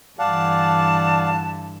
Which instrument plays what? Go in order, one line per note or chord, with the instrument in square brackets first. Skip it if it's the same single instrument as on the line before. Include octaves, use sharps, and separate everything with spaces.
[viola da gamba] G2 D3 E3 [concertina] D5 F5 F#5 [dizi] A5